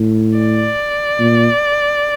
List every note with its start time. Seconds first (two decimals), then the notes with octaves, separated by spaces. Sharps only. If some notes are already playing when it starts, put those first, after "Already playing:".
Already playing: A2
0.39 D5
1.20 A#2